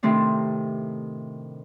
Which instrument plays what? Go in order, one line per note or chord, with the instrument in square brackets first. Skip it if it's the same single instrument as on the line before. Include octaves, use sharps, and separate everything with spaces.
[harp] A2 C3 D#3 A3 C4 D4